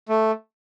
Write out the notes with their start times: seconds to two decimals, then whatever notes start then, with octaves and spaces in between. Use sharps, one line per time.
0.09 A3